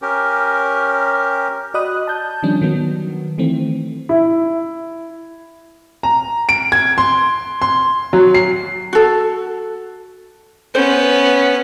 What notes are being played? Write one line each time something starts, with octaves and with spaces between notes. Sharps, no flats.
C#4 G4 A#4
F#4 D5 D#5 B5 D#6 F#6
A5 G6
D#3 F3 G3 C#4 D4
D#3 F#3 B3
D#3 E3 A3 C4
E4
A#5
D7
G#6
C6
C6
F#3
C7
F#4 A4
B3 C#4 C5